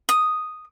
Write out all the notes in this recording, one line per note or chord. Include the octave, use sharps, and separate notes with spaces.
D#6